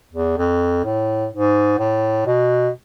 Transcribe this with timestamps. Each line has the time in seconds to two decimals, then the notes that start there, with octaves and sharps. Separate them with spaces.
0.13 E2
0.38 F2
0.84 A2
1.32 G#2
1.79 A2
2.26 B2